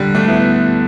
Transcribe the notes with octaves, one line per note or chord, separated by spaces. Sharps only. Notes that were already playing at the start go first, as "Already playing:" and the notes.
Already playing: D3 G3
A3 D4
B3 E4